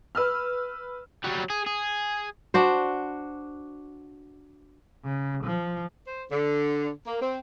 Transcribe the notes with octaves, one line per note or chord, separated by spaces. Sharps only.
B4 E6 F6
F#3 G3
G#4
G#4
D4 F#4 C5
C#3
F3
C5
D3
A#3
C4